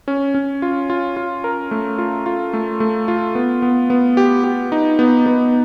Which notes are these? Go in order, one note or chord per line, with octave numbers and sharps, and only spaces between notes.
C#4
C#4
F4
F4
F4
A#4
A3
F4
F4
A3
A3
F4
B3
B3
B3
G4
G4
D#4
B3
B3